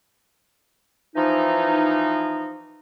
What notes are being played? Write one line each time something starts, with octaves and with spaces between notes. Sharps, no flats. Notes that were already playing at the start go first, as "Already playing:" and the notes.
E3 F3 D#4